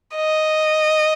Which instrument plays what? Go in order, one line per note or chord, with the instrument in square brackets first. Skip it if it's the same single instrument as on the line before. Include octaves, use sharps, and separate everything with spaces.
[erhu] D#5